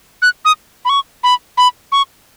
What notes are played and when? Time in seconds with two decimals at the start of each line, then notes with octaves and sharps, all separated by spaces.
0.22 F#6
0.45 D#6
0.85 B5
0.89 C#6
1.23 B5
1.57 B5
1.92 C#6